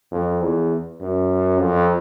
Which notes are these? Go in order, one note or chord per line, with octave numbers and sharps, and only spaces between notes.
F2
E2
F#2
F2